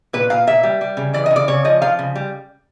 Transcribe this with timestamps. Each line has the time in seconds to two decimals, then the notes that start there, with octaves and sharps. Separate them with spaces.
0.13 A#2 B4
0.30 A#2 F5
0.47 A#2 E5
0.63 G3
0.81 G3
0.97 C#3
1.13 E3 D5
1.26 D#5
1.31 C#3
1.36 D5
1.48 C#3 C#5
1.65 F3 D#5
1.82 F3 F5
1.99 C#3
2.15 G3